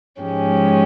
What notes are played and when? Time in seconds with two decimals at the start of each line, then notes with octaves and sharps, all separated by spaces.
0.21 G#2 F3 G#3 C#4 G4